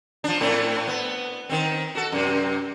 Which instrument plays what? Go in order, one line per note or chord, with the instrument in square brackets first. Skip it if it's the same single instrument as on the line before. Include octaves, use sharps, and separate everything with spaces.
[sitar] F3 D4
A2 A3 C4
B3
D#3 C4
F#4 A4
F#2 C3